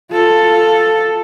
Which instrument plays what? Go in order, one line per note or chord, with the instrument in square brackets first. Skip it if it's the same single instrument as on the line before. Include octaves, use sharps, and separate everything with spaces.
[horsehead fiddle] F4 A4